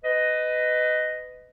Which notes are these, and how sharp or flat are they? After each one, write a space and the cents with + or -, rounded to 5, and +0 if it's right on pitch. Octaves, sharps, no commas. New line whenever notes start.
B4 +20 D#5 +0